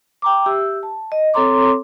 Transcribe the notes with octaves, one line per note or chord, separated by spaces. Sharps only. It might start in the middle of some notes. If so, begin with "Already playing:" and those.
G5 A#5 D6
G4 E5 E6
A5
D#5
C4 A4 C#5 A#5 C6 D6